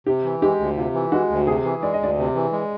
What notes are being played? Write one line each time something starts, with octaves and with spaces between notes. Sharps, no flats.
C3 G4
E3
G#3 G4
D2
C3 F4
E3
G#3 F#4
D2
C3 G#4
E3
G#3 D5
D#5
D2 D5
C3
E3
G#3